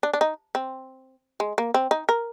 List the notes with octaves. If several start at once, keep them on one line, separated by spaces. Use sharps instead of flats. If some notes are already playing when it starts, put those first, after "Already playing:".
D4
D4
D#4
C4
G#3
A#3
C4
D#4
A#4